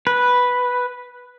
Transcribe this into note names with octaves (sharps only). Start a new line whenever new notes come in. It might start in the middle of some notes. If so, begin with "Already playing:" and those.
B4